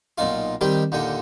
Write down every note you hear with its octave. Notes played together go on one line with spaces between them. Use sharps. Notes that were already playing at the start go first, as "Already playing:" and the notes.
B1 A#2 D#4 F4
D#3 G3 C4 G4
D#2 A#2 D3 G5